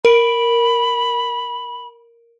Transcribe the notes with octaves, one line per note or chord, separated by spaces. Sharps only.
A#4 B5 D7